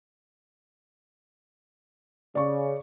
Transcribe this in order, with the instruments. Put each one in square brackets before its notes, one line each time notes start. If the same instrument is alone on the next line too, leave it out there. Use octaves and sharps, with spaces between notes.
[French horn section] C#3 [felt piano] D5 C#6